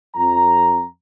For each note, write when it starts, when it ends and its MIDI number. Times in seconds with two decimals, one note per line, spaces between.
0.15 0.83 41
0.15 0.83 82